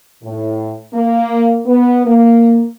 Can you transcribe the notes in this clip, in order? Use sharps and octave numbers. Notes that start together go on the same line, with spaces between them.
A2
A#3
B3
A#3